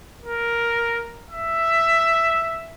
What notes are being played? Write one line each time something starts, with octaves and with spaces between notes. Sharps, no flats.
A#4
E5